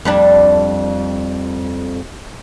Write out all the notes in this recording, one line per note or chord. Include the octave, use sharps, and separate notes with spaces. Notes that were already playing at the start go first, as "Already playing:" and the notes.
F2 G3 D4